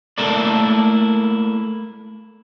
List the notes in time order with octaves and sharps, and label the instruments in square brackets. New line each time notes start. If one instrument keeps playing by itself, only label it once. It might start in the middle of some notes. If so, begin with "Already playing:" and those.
[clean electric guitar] A3 A#3 E4 A4 A#4 D5